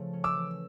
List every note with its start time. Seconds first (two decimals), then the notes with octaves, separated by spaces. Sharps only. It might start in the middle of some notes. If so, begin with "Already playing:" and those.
Already playing: C#3 F3 A3
0.13 C#4
0.24 D6 E6
0.34 E3